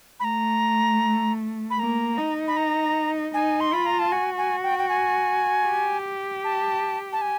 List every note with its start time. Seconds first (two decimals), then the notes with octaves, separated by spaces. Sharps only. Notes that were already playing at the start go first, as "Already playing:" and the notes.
0.20 B5
0.24 A3 A#5
1.70 B5
1.79 A#3 A#5
2.18 D#4
2.48 B5
2.57 A#5
3.34 D#4 G#5
3.60 C6
3.73 F4 B5
3.86 A#5
3.99 A5
4.12 F#4 G#5
4.38 G#5
4.63 G5
4.79 G5
4.89 G#5
5.67 G4
6.44 A5
7.13 A5
7.22 G#5